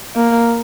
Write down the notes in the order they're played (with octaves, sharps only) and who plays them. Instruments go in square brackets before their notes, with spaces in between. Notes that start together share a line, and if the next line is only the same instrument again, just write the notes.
[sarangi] A#3